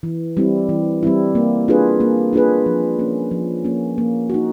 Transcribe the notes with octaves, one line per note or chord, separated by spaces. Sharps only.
E3
G3 C4 E4
E3
G3 C4 E4
A#3
D4 F4 G#4 B4
A#3
D4 F4 G#4 B4
F3
A#3 C#4
F3
A#3 C#4
A#3
D#4 F#4